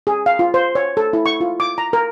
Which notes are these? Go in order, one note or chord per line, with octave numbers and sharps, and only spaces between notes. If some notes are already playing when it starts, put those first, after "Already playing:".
G#4
F5
F4
C5
C#5
A4
E4
C#6
F4
D6
A#5
A#4